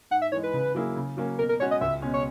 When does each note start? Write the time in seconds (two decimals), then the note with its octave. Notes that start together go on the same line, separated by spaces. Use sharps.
0.11 G#2 F#5
0.22 E5
0.32 E3 G#3 C#5
0.43 B4
0.53 C#3
0.75 F#3 A#3 E4 G#4
0.96 C#3
1.17 F#3 A#3 C#4
1.39 B2 A#4
1.49 A#4
1.60 G#3 C#4 F#4 C#5
1.71 D#5
1.81 C#2 E5
2.02 B2 G#3 C#4
2.14 C#5